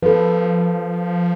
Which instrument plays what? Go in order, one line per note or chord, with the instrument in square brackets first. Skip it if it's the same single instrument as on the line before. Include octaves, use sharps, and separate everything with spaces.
[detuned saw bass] F3 [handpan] A4 B4